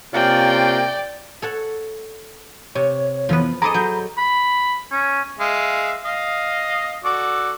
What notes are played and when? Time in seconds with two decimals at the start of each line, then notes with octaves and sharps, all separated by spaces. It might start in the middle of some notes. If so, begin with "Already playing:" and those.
0.14 C3 A#3 C#4 F4 D5 G5
1.42 A4 C#5 F#5
2.75 C3 C#5
3.29 F2 E3 F3 B3 B4
3.62 G#4 A4 D#5 A#5 B5 D6 D#6
3.74 F#3 G6
4.18 B5
4.91 C#4
5.40 G#3 E5 F5
6.05 D#5 F5
7.04 F#4 A4 D5